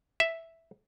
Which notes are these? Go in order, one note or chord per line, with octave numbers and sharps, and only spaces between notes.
E5